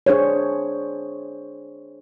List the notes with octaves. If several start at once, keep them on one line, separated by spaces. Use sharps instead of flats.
D4 G#4 C5 C#5